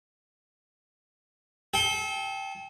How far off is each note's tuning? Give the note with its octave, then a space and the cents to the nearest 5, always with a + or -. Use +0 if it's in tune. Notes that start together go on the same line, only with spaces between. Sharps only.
A4 -35 G5 +0